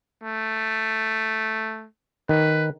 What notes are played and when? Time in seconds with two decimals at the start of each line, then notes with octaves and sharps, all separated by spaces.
0.23 A3
2.29 D#3 B4